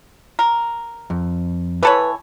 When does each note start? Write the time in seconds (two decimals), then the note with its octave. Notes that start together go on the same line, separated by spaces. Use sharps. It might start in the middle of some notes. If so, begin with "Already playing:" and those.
0.39 A#4
1.10 F2
1.83 E3 A4 B4 C#5 B5